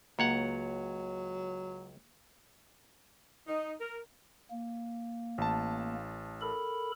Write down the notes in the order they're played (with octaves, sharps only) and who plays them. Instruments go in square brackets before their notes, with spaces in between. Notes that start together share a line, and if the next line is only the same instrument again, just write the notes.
[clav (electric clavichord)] C#2 C#5 F#5 [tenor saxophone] F#3 [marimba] A#3
[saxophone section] D#4
A#4
[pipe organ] A#3
[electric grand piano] A1 A5
[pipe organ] A4 A#4 B5